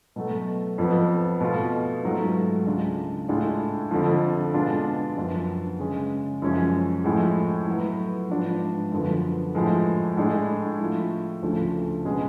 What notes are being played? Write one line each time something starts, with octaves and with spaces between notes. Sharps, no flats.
B2 F#3 A3
F2 F3 B3
B2 A3 F4
G#2 F#3 A3 F4
C#2 C#3 G#3 D4 F4
A2 G#3 D4 F4
F2 D3 F3
B2 G#3 D4 F4
F#2 F3 B3 D4
C#3 G#3 C#4
F#2 F3 G#3 C#4
A2 F3 G#3
A2 F#3 B3
G#2 F3 B3 D4 F4
F#2 D3 F3 B3
A2 F3 G#3
A2 G#3 D4
A2 F3 A3 F4
D2 C#3 F3 A3 D4
B2 G#3 C#4